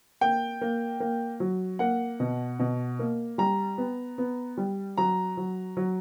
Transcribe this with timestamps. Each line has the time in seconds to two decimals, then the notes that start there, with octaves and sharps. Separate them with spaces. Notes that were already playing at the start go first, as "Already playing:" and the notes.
0.21 A#3 G5
0.61 A#3
1.00 A#3
1.40 F#3
1.79 A#3 F#5
2.20 B2
2.59 B2
2.99 A#3
3.38 G3 A#5
3.78 B3
4.18 B3
4.57 G3
4.97 F#3 A#5
5.37 F#3
5.77 F#3